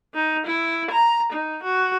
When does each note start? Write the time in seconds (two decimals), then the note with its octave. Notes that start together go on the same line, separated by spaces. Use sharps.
0.14 D#4
0.46 E4
0.91 A#5
1.33 D#4
1.63 F#4